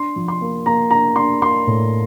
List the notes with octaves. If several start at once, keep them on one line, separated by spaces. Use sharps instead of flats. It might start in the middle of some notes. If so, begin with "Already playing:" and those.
Already playing: D4 C6
F3
C6
A#3
A#3 A#5
D4 A#5
D4 C6
A#3 C6
A2